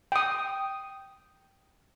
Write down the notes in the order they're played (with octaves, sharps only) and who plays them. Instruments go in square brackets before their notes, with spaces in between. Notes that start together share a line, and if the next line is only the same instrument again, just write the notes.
[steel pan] G5 D#6